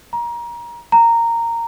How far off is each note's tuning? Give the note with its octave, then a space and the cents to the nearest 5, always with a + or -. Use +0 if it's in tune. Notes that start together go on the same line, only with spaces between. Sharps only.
A#5 +25
A#5 -10